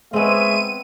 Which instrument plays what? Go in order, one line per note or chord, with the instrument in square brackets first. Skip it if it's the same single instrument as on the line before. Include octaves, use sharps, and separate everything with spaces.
[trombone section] G#3 [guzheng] B3 C4 [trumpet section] C#5 E5 [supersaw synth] D#7